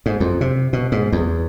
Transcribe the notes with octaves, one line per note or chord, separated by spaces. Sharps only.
G#2
F2
C3
B2
G#2
E2